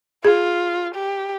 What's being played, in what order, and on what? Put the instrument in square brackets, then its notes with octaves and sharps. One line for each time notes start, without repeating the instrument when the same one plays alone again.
[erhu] F4 [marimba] G#4
[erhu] G4